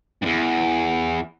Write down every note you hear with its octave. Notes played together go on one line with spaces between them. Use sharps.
E2 G2